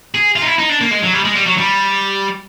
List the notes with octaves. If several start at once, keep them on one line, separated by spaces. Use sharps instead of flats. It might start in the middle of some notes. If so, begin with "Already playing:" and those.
G#4
F4
D#4
E4
D#4
D4
A#3
G#3
F#3
G3
G#3
G3
F#3
G3